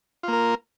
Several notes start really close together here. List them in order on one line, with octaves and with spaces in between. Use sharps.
F4 A#3 A#4